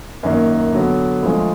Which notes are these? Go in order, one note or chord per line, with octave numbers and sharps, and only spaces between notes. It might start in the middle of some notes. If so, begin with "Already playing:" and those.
F#2 D#3 A#3
D3 F#3 B3
D2 D3 F3 G#3